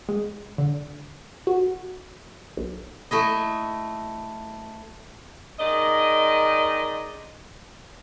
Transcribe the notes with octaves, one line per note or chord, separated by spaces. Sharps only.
G#3
D3
F#4
B1
A3 E4 D#5
D#3 G#3 D5 D#5